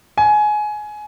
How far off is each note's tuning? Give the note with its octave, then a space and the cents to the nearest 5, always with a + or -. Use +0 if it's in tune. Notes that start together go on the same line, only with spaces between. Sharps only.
G#5 +20